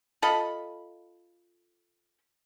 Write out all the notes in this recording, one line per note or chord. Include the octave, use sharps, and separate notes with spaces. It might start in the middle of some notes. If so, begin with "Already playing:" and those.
F4 A4 D#5 B5